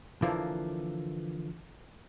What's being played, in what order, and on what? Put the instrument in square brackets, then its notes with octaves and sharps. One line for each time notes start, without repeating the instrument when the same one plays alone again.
[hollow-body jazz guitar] D3 E3 F3 A#3